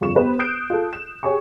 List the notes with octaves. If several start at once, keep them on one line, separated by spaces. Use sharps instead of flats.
G1 F2 F4 C#6 E7
B3 G4 B4 C5
D#6 F#6 G6 C7 D7 E7
F4 A4
E7
G4 G#4 C#5 G#5 C#6